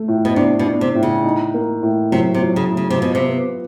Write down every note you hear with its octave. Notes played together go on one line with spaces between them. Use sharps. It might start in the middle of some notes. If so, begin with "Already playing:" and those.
Already playing: A3
A2
B2
C3 D4
B2
D4
C3
A2
C#3
D#4
A#3
A2
C3 F#3
C3
F#3
C#3
A2
C#3
C3
B2 F4
C3
B3